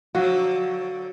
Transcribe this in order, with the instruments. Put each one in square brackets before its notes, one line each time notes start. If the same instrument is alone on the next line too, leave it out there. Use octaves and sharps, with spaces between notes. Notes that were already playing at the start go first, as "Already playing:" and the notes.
[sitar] D3 F3 F#3 [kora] F#4 [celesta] F5 F#5